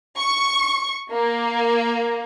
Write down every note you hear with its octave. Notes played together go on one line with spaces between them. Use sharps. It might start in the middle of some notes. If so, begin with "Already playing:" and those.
C#6
A#3